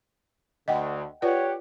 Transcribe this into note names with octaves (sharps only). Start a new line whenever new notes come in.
D2 D3 D#5 F#5 G5
F4 G4 B4 C#5 D5 F#5